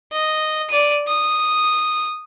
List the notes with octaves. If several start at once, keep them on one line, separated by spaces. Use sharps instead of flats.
D#5
D5 D#7
D#6